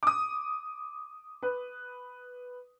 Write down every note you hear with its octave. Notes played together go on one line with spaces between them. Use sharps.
D6 D#6
B4